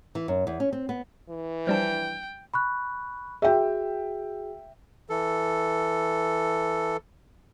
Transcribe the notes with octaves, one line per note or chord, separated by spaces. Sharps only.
E3
F#2
E2
C#4
C4
B3
E3
F3 G3 D4 G5
B5 C#6 F#6
F#4 G#4 E5 G5
E3 A4